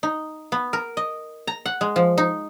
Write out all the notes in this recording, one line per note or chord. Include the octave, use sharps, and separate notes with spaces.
D#4
B3
A#4
D#5
A#5
F#5
G#3
F3
D#4